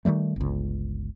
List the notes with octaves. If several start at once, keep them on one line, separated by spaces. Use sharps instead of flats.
D#3 F3 G3 A3
G1 C#2